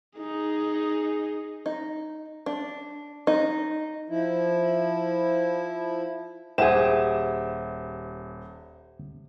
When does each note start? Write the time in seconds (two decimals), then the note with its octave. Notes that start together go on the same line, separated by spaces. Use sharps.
0.19 D#4 G#4
1.66 D#4
2.46 D4
3.27 D#4
4.09 F3 E4
6.58 D#1 G4 G#4 C5 E5 F#5 E7